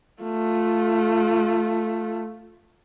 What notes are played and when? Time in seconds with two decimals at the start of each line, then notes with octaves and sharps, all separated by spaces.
0.22 A3 F4